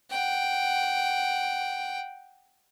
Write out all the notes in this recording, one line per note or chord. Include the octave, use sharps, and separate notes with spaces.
F#5 G5